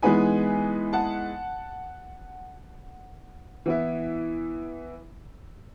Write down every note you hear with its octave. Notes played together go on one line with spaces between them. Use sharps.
E3 G#3 B3 D#4 G#5 B5
F#5 A5
E3 B3 E4